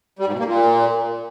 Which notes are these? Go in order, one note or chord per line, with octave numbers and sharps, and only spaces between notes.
G3
G#2
B2
A#3
A#2